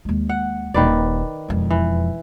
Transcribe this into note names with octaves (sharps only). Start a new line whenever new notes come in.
D#2 G#3
F#5
D#1 D#3 A#3 B4 D5
E1 F2
E3